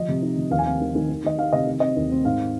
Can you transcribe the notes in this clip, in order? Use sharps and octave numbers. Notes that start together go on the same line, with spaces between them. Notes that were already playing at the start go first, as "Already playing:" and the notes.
Already playing: F3 D#5
C3
D#4
F3
D#2 F5
G#5
C4 F5
D#3
D#3
D#3
D#3 D#5
D#3 F5
C3 D#5
D#3
C4 D#5
D#2
C4
G#2 F5